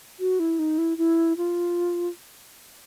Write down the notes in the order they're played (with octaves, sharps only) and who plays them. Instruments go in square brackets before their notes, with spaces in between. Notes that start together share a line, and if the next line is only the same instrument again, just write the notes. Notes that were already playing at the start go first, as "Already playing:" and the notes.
[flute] F#4
E4
D#4
E4
E4
F4